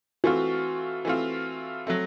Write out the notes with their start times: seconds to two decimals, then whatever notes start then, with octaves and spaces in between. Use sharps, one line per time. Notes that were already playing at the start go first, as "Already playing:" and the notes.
0.24 E3 A3 C4 F4 F#4
1.05 E3 A3 C4 F4
1.87 F#3 A3 C4